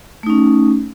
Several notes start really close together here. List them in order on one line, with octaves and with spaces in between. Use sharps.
A3 D#4 C#4